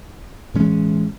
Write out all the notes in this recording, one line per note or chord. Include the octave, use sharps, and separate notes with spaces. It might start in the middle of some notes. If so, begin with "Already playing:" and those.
A2 E3 G#3 C#4